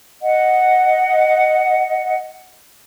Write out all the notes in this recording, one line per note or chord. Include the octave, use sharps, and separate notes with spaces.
D#5 F#5